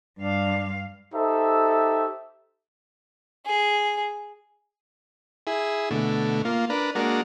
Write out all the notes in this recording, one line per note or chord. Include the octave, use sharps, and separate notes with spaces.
G2 D4 F5
D#4 G4 A4 C5 E5
G#4
E4 G#4
B2 D3 A3
A#3 F4
D4 A#4 B4
G#3 A#3 D4 F#4 A#4